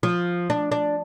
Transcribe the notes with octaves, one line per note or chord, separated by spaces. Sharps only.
F3
D4
D4